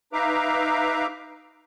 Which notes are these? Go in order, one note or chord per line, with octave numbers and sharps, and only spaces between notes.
D#4 B4 E5 F5 A#5 D6